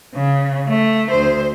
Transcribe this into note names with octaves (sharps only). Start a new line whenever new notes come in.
C#3
A3
D2 C5